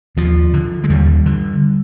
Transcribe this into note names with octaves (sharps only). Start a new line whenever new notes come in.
D#2 F3
D3
G#3
D#2 G3
D3